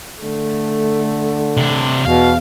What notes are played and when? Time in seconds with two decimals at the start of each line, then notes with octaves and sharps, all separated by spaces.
0.22 D3 A3
1.57 C3 D4
2.05 E2 B2 F5